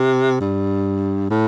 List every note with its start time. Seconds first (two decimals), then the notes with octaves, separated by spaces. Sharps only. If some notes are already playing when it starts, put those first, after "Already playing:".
Already playing: C3
0.41 G2
1.30 A2